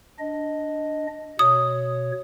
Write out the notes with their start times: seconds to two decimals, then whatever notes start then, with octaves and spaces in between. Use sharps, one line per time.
0.19 D4 D#5
1.39 B2 C#5 D#6